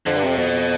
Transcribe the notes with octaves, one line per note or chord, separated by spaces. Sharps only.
F2 D3
G2
F2 C3
F2 B2